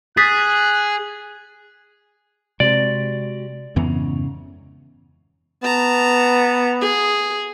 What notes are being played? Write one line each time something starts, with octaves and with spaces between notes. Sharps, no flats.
G#4 D#6 F#6 A6 B6
C3 G#3 F#4 G4 D5
F2 G#2 C#3 E3 B3 A#5
B3 A5 A#5
G#4